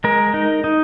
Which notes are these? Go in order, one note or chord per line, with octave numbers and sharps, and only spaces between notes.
G#3 A#4
D#4
D#4